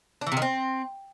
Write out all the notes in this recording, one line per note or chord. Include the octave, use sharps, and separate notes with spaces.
D4
E3
C3
D#3
C4